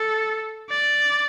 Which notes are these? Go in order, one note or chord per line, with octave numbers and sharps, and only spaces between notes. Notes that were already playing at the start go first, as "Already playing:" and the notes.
Already playing: A4
D5